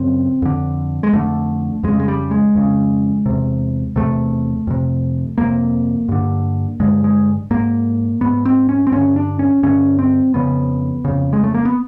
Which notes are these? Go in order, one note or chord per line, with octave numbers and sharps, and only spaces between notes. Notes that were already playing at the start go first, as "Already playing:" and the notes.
Already playing: F#2 C#3 C4
F2 D3
G#3
F2 D3 A3
F2 C#3 G#3
G#3
G3
G#3
F2 C#3
E2 C3
E2 C3 A3
F2 C3
F2 C3 A#3
G2 D3
G2 D3 G#3
G#3
G#2 A#3
G#2 B3
C4
C#4
C4
G2 D3 C#4
D4
C#4
G2 D3 C#4
C4
F2 C#3 B3
F2 C#3
G#3
A3
A#3
B3